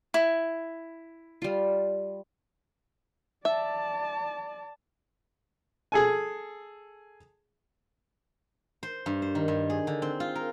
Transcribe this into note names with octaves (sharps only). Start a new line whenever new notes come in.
E4
G3 F4
D5 E5 A5
G#4 A4 G#5
C5
G2
C5
D#3
G2
G#4
D3
C4
F4
A#4